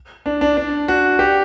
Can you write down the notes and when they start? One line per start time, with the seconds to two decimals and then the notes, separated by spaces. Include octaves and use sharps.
0.26 D4
0.41 D4
0.57 D4
0.88 F#4
1.19 G4